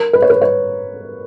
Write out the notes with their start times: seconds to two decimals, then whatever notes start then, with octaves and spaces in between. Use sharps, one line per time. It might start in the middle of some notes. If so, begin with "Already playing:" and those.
Already playing: A#4
0.13 B4
0.22 C#5
0.30 B4
0.42 C#5